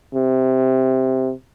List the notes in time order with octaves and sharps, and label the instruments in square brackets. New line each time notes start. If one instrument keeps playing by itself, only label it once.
[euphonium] C3